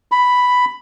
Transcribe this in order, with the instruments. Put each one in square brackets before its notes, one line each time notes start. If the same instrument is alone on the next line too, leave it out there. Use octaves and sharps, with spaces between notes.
[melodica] B5